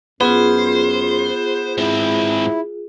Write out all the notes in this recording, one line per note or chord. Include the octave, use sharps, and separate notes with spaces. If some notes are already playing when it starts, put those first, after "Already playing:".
F#2 B3 F4 G#4 C5
G#2 C4 E4